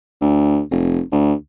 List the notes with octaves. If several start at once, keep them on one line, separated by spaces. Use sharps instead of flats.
D2
F1
D2